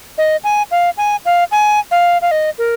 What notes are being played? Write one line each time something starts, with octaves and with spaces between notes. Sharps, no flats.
D#5
G#5
F5
G#5
F5
G#5
F5
F5
D#5
A#4